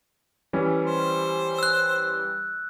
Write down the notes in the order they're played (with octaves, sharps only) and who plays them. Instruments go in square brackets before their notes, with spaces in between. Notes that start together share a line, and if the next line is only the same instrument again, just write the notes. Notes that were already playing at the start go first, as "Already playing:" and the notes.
[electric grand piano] E3 G3 C#4
[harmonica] C5
[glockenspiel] E6 F#6